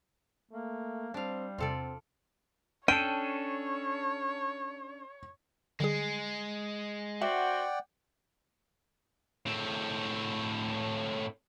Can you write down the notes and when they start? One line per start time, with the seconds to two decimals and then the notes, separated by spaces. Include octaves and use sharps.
0.51 A3 A#3
1.14 G3 C4 D4 F5
1.58 E2 C3 C4 F4 A4 D5
2.88 C#4 D4 A4 C#5 G5 D#7
5.80 D3 G3 G#3 G#4
7.22 C4 F#4 D5 E5 F#5 G5
9.46 A2 C4